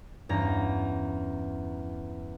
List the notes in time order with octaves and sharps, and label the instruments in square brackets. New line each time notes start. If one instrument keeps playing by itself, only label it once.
[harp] E2 G2 C#4 A#5